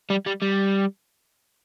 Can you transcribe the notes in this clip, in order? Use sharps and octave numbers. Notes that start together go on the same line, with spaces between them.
G3
G3
G3